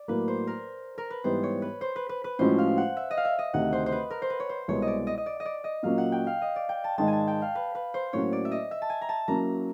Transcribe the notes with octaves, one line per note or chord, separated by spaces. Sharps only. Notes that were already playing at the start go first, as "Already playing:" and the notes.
Already playing: D5
A2 F#3 A#3 B4
C5
A#4
A#4
B4
G#2 E3 G3 B3 C5
C#5
B4
C5
B4
B4
B4
A2 F3 G#3 C#4 F#4 C5
F5
F#5
E5
D#5
F5
E5
D#5
D2 C3 D#3 F#5
C5
C5
B4
A#4
C5
B4
C#5
C5
C2 B2 G#3 B3 C#5
D#5
D5
D#5
D#5
D5
D#5
D5
D#5
A#2 F#3 A#3 C#4 F5
F#5
G5
F5
D#5
D5
G5
A5
G#2 D#3 G#3 A5
G#5
A5
G5
F5
B4
B4
C5
A2 F#3 A#3 C#4 F#4 C#5
D5
E5
D#5
E5
A5
G#5
A#5
A5
F#3 A#3 C#4 E4 A#5